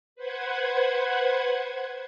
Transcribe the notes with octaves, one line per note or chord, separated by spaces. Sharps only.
B4 C5 F#5 G#6